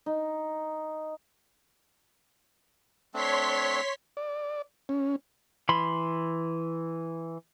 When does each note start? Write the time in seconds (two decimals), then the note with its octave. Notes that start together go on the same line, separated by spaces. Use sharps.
0.06 D#4
3.14 A3 C4 D4 C#5 C6 B6
4.17 D5
4.89 C#4
5.69 E3 B5 C6